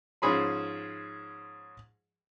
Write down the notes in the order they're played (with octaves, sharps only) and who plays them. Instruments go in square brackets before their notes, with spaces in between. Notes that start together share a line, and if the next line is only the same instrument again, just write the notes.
[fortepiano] G#2 F3 C#4 G#4 B5 C6